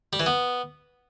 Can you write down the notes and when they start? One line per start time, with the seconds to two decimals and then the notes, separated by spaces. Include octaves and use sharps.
0.13 G3
0.20 E3
0.26 B3